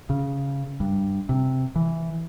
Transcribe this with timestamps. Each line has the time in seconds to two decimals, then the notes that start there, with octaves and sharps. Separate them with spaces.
0.10 C#3
0.80 G2
1.29 C3
1.76 E3